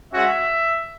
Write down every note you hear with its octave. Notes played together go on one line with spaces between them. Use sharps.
G#3 C#4 F#4 E5